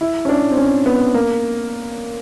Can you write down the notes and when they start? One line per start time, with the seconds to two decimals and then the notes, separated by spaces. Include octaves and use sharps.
0.01 E4
0.25 C#4
0.29 D4
0.51 C4
0.57 C#4
0.86 B3
1.14 A#3